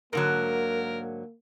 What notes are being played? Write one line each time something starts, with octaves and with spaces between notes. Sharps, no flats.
G#2 D3 F#3 A#3 A#4